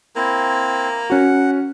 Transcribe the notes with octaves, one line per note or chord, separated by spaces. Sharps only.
A#3 C4 E4
C#4 F#4 F#5